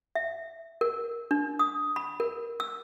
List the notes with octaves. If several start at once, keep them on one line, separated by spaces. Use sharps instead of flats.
E5
A#4
D4
D#6
B5
A#4
E6